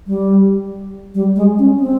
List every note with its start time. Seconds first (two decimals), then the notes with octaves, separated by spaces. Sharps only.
0.07 G3
1.15 G3
1.36 G#3
1.59 C#4
1.80 C4